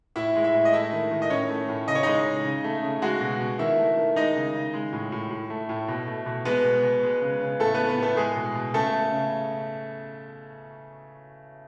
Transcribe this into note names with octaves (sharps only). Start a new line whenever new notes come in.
A2 E4 E5
G#3
E4 E5
A2
D#5
A3 E4 E5
D#3
D#3
D#5
A2 C#4 C#5
A3
A2
C#3 D#5
C#5
G#3 D#4 D#5
C#3
C#3
A3
C#3
G#3 F#4 F#5
B2
B2
D#3 E4 E5
A3
D#3
G#3 D#4 D#5
C#3
C#3
G#3
A2
A2
A2
A3
A2
B2
A3
B2
G#3 B3 B4
B2
B2
G#3
C#3
C#3
A2 A3 A4
A3 B3 B4
B3 B4
A2 A3 A4
G#3 G#4
B2
B2
C#3 A3 A4
A3
C#3